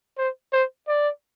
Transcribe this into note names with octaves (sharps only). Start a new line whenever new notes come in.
C5
C5
D5